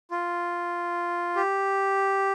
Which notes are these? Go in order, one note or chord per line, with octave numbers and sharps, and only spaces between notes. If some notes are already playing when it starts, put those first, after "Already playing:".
F4
G4